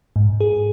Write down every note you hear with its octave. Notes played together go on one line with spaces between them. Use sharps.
G#2
G#4